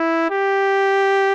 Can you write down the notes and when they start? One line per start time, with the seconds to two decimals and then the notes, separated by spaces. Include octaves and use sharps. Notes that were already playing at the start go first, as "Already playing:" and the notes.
Already playing: E4
0.31 G4